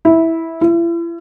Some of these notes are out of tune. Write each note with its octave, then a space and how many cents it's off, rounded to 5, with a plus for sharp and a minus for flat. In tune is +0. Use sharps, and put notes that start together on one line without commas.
E4 -10
E4 +40